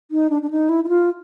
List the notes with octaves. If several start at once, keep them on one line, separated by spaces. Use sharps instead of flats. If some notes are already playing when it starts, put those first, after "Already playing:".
D#4
D4
D4
D#4
E4
E4
F4